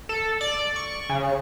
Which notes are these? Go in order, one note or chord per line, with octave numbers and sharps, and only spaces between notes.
A4
D5
C#6
C#3